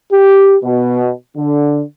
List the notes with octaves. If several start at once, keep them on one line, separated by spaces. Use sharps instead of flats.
G4
B2
D3